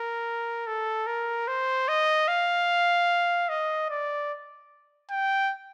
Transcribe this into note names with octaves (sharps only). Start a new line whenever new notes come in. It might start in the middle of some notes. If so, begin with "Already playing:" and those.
Already playing: A#4
A4
A#4
C5
D#5
F5
D#5
D5
G5